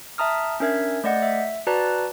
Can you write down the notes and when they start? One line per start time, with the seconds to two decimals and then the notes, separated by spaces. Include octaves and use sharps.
0.18 E5 A5 A#5 D#6 F6
0.60 C#4 D4 A#4 E5 G#6
1.04 A3 D5 D#5 F#5 G6
1.23 E5
1.67 F#4 B4 D5 A5 A#5 F#6